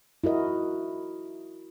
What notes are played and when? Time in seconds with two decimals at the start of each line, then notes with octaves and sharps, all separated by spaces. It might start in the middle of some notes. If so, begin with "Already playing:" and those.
0.24 E4 F#4 A#4 D#5